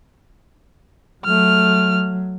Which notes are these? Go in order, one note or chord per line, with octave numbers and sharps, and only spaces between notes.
F#3 A3 F6